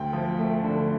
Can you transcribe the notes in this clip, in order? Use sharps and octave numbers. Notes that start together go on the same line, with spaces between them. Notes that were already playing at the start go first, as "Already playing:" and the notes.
Already playing: D2 G5
F3
A3
D3